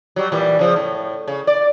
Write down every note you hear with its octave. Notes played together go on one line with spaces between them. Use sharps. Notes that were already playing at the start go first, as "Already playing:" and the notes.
F#3 G3
A#2 E3 G3
C#3 F3
A2
C#3
D5